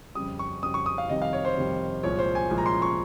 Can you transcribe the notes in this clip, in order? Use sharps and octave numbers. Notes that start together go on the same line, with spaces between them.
F2 C#3 G3 D#6
C#6
F2 C#3 G3 D#6
C#6
D#6
F5
F2 C3 D#3 G3 D#5
F5
C#5
C5
F2 C3 D#3 G3
C2 A#2 F3 G#3 C#5
C5
G#5
C2 A#2 F3 G#3
A#5
C6
C#6